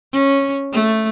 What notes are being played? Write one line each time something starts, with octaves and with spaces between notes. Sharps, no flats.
C#4
A3